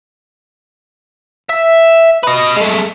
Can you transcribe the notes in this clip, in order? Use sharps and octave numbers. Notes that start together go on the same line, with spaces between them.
E5
B4 D#5
G#3 A3